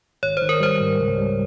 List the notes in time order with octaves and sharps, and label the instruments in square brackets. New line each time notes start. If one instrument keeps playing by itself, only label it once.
[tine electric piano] G#1 [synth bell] C#5
[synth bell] C5
[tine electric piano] D#3
[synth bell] A#4
[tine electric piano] G3 [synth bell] C5
[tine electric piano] G#2
C#2
G3